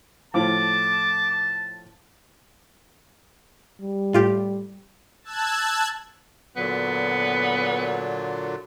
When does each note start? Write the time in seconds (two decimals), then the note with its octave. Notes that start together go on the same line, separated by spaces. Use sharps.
0.34 A2 F3 A5 D6
3.82 G3
4.13 A2 F4 G4
5.24 A5 E6 F#6 G#6
6.56 A#2 D3 F#3 B3